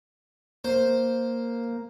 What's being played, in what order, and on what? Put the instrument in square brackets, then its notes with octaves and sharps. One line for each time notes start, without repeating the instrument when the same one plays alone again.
[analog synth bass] A#3 [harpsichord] C5